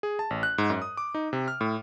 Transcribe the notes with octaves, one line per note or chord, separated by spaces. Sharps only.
G#4
A5
A1
F#6
G#2
F#2
D#6
D6
D#4
C3
F6
A2